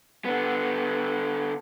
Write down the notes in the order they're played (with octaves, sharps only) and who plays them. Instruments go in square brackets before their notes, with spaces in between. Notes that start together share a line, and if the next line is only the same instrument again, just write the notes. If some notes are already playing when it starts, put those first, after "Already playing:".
[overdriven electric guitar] D3 B3